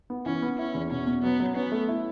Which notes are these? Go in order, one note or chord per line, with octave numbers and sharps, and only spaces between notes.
B3
E3 C#4
B3
C#4 E4
E2
B2 C#4
B2
F#3 B3
F#3
B3 C#4
A3
E4